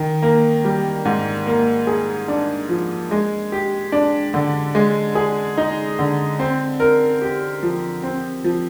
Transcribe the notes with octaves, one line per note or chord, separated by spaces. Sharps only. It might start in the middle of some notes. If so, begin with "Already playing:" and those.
Already playing: D#3
A#3
G3
G#2
A#3
G#4
D4
F3
G#3
G4
D4
D3
G#3
G#4
D#4
D3
C4
A#4
G4
F3
C4
F3